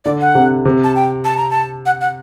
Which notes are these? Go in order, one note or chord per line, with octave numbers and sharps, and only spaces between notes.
D3 D5
F#5
C3
C3
A5
G5
A5
A#5
A5
F#5
F#5